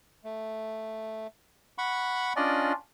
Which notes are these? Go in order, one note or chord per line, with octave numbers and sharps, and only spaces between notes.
A3
F#5 B5 C#6
C#4 D4 F4 D5 D#5